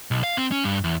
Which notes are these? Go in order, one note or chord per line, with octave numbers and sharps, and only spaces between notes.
B1
F5
C4
C#4
G2
E2